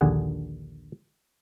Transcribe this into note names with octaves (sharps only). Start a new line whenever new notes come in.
A#1 D#2 D3 G#4 F#5